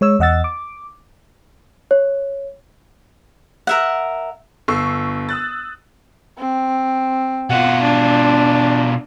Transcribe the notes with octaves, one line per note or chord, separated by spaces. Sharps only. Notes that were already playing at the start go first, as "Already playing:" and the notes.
G#3 C#5 E6
E2 D#5 F#5 E6 A6
D6
C#5
A#4 E5 F#5
G1 C#6 E6 C7
D#6 E6 F#6 A6
C4
B2 F4 F#5
D4